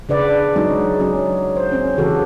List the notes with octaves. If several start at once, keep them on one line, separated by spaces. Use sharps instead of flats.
C#3 D4 B4 D5 F#5
F#3 G#3 C#4 D#4 F#4
F#3 C#4
C5
C4 C#4
C#3 E3 F#4 G4 A4 A#4